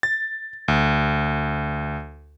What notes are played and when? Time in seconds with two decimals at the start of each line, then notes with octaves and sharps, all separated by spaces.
0.03 A6
0.68 D2